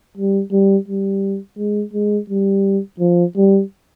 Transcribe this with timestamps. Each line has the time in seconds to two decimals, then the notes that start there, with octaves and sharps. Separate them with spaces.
0.17 G3
0.52 G3
0.88 G3
1.58 G#3
1.93 G#3
2.30 G3
3.00 F3
3.36 G3